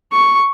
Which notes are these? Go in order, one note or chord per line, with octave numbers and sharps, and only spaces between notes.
C#6